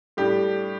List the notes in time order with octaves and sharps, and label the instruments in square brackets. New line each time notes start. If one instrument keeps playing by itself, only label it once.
[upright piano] A2 G3 D4 G4